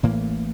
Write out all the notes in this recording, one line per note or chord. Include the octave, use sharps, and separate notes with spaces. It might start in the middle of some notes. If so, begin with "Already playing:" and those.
A1 A2 E3 A#3